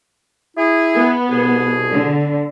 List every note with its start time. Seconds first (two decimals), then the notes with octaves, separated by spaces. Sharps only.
0.57 E4 G#4
0.96 B3
1.30 C2 B2 G#4
1.92 D3